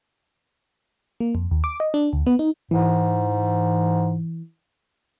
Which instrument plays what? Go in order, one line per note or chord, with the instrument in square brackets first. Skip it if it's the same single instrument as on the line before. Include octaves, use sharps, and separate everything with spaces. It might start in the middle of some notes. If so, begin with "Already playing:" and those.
[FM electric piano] A#3
F2
D#2
D6
D#5
D4
D2
B3
D#4
[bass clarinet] G#2 [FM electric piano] E3